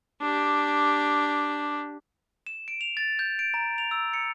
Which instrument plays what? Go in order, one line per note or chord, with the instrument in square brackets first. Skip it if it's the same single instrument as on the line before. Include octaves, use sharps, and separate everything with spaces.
[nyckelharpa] D4 G4
[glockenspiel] E7
D7
F7
A6
G6
D7
A#5
F7
E6
C#7